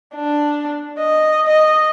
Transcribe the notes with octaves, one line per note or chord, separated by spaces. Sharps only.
D4
D#5
D#5